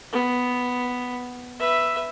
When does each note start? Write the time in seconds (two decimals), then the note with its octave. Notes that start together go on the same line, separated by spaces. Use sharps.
0.12 B3
1.60 B4 E5